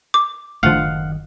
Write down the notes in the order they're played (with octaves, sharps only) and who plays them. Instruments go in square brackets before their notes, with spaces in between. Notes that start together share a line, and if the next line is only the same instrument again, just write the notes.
[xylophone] D6
[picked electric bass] F#1 D#3 [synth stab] A2 D3 F3 [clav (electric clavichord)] F5 F#5